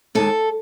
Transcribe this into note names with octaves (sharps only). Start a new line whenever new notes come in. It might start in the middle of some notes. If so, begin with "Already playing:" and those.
D#2 D#3 G#3 A4